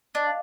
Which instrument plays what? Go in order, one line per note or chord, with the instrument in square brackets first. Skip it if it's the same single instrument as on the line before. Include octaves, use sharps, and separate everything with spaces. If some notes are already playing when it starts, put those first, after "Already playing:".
[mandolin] D4 [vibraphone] D#5
[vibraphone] F5